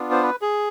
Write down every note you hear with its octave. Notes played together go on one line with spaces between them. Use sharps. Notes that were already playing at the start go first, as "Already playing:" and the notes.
Already playing: B3 D4 F4
C5
B4
G#4